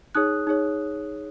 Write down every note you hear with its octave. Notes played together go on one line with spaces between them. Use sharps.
D#4 G#4 C#5 D#6 F#6
D#4 G#4 C#5